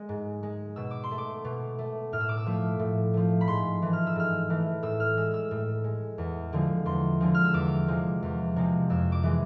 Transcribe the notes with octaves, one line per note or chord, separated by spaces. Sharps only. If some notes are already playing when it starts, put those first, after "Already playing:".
Already playing: G#3
G#2
G#3
B2 E6
D6
C6
A3
D6
B2
A3
A2 F6
E6
D6
E6
F3 A3
A2
F3 A3
B5
G#2 C6
E3 A3
F6
E6
G#2 F6
E3 A3
A2 E6
F6
G#3 E6
E6
A2
G#3
E2
D3 F3 G#3
E2 C6
D3 F3 G#3
F6
E6
E2 D6
C3 F3 G#3
E2
C3 F3 G#3
F2 E6
D6
E3 G#3